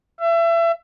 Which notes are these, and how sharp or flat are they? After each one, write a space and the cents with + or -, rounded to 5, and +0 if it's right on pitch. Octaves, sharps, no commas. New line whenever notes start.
E5 +30